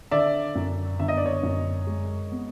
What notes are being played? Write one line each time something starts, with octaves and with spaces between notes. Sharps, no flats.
D3 D5 E5
F#2
G1 E5
D#5
D5
C#5 D#5
F#2
G#3
B3